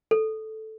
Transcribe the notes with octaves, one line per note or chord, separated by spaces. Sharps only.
A4